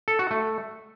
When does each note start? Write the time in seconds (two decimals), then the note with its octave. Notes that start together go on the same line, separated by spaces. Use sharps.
0.08 A4
0.19 F#4
0.31 A3